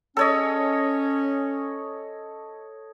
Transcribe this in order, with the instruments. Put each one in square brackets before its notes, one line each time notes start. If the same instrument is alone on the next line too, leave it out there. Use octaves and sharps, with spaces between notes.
[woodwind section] C#4 [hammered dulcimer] A4 C#5 D#5